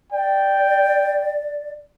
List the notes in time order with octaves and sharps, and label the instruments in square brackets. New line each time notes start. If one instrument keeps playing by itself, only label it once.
[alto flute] D5 [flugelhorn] G5